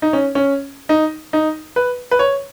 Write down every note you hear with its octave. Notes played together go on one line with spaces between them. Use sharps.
D#4
C#4
C#4
D#4
D#4
B4
B4
C#5